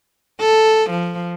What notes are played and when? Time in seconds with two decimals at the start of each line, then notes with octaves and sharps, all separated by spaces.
0.40 A4
0.91 F3